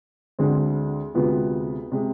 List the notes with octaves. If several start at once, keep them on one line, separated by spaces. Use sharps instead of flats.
D2 D3 G#3 C4
D2 C3 G#3 B3 F4
C3 G#3